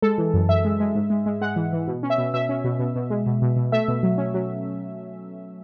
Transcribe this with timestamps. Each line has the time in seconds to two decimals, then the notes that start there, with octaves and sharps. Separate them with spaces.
0.02 G#3 A4
0.18 E3
0.34 F#2
0.49 F#2 E5
0.65 G#3
0.80 G#3
0.95 G#2
1.10 G#3
1.26 G#3
1.41 G#3 F#5
1.56 E3
1.73 E3
1.87 B2
2.03 C#4
2.10 E5
2.18 B2
2.34 B2 E5
2.49 C#4
2.64 B2
2.79 B2
2.95 B2
3.10 G#3
3.26 B2
3.42 B2
3.56 B2
3.72 A3 E5
3.88 B2
4.03 F#3
4.18 C#4
4.34 F#3